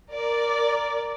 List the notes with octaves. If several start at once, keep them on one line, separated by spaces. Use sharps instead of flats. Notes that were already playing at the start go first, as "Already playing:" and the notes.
A#4 D5